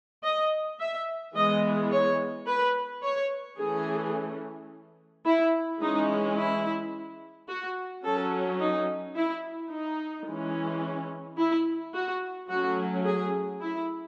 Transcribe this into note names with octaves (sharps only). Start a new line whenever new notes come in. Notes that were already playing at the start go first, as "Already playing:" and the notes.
D#5
E5
E3 G#3 B3 D#5
C#5
B4
C#5
E3 A3 C#4 G#4
E4
E3 G#3 C#4 D#4
E4
F#4
F#3 C#4 A4
D#4
E4
D#4
E3 G#3 C#4
E4
F#4
F#3 A3 C#4 F#4
G#4
E4